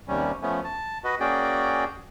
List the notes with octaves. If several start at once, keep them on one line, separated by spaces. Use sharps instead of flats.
D#2 C3 G3 C#4
F3 A3 B3 C#4
A5
F#4 B4 D#5
A#3 C#4 F#4 G#4 D5 G5